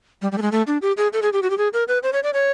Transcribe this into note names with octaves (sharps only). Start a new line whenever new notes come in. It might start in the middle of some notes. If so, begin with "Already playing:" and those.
G3
G3
A3
G#3
A3
D4
G4
G#4
A4
G#4
G4
F#4
G4
G#4
A#4
B4
C5
C#5
D5
C#5